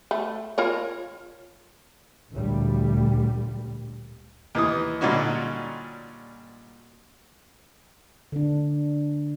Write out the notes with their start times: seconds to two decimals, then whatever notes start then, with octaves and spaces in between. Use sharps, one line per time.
0.11 A3
0.58 F4 A#4 C#5
2.32 A1 D2 A#2 G3
4.55 D#2 E3 D#6
5.01 A#2 D3 G3 C#4 D#4 F#4
8.32 D3 D4